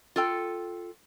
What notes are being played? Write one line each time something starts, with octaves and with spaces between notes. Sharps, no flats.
F4 A4 G5